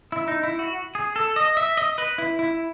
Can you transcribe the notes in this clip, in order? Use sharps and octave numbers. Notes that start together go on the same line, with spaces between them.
E4
D#4
E4
F#4
G#4
A4
D#5
E5
D#5
B4
E4
E4